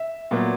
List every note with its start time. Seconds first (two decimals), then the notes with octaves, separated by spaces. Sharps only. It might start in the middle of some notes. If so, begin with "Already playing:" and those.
Already playing: E5
0.31 A#2 F#3 B3